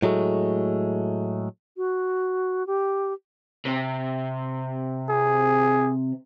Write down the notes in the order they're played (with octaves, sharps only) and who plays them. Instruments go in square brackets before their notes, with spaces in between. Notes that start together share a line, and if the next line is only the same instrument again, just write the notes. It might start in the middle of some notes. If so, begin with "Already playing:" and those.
[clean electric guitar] A2 F#3 G#3 A3
[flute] F#4
G4
[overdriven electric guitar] C3
[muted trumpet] G#4